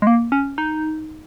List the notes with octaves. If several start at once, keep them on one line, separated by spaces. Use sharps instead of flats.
G#3
A#3
C#4
D#4